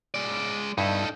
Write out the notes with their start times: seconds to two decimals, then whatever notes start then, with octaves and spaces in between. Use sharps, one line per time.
0.14 G#3 D5
0.78 G2 D#4 E4 A4 A5